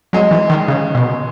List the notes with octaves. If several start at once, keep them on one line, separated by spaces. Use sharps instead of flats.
F#3 G#3
E3
D#3
C#3
B2